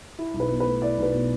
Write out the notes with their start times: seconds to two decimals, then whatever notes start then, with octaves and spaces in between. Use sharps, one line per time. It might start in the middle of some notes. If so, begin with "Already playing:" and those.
0.19 E4
0.34 B1
0.40 B4
0.50 B2
0.60 B4
0.67 A3
0.82 E4 D5
0.97 B1
1.03 B4
1.14 B2